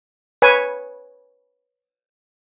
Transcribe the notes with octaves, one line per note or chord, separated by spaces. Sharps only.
B4 C#5 G#5